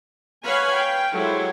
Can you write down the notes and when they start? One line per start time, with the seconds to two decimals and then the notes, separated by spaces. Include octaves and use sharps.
0.45 B4 C#5 F5 F#5 G#5 B5
0.74 G5
1.13 F#3 G#3 E4 G4 A4 C5